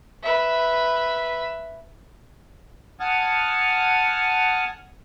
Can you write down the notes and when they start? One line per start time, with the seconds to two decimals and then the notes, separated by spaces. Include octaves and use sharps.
0.23 B4 E5
3.00 F#5 G#5 A5 D#6 F6